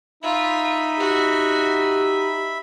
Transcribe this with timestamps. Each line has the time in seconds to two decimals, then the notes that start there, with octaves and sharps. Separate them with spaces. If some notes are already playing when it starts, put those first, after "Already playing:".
0.23 D#4 F4 E5 B5
0.99 F#4 G4